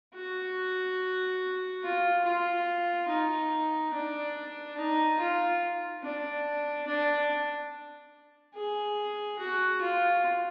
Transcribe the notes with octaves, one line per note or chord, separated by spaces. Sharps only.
F#4
F4
F4
D#4
D4
D#4
F4
D4
D4
G#4
F#4
F4